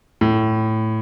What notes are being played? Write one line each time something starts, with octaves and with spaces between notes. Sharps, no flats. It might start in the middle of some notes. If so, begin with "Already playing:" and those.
A2